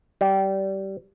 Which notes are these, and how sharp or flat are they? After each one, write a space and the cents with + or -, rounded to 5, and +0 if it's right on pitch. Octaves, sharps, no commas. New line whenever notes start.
G3 -20